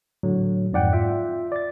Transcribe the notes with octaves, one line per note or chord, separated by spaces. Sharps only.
A2 D3 F#3
F2 G#2 D5 F#5 G5
F4 E5
D5 A6